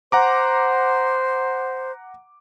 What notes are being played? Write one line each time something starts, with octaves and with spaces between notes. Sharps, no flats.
C5 F#5 A#5 D6